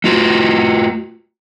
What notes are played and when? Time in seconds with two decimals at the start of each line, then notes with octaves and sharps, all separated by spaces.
0.04 A3 F4 F#4